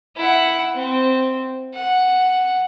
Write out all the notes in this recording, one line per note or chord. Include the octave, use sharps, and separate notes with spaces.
E4 F#5
C4
F#5